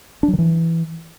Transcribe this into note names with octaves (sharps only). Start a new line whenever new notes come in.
D4
F#3
D#3
E3